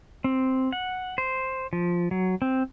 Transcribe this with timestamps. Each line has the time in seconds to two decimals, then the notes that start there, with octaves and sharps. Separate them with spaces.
0.24 C4
0.72 F#5
1.18 C5
1.73 F3
2.11 F#3
2.42 C4